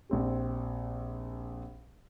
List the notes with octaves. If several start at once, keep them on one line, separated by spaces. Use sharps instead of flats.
A#1 C4 G4